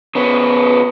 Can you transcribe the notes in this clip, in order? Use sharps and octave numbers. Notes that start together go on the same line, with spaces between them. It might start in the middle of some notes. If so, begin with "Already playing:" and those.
C#3 B3